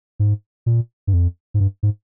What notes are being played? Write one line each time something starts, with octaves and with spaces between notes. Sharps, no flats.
G#2
A#2
G2
F2
G#2
G2
G#2